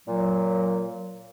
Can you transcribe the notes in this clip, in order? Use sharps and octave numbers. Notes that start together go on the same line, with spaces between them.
A#2 F#3